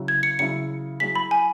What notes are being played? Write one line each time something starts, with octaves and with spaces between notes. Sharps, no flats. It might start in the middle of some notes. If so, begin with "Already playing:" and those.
Already playing: C#3 F#3 E4
G#6
C#7
C#3 F#3 E4 C#7
F#3 E4 G#4 B6
B5
G#5